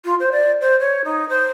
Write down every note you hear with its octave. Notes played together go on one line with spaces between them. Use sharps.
F4
C5
D5
C5
C#5
D#4
C5